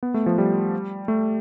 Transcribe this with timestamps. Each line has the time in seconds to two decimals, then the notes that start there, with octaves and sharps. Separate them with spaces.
0.03 B3
0.14 A3
0.26 F3
0.38 G3
1.08 A3